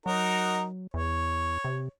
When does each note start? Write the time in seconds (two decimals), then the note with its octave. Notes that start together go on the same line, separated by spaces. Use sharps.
0.06 F#3 D#4 F#4 A#4
0.94 E2 C#5
1.65 C3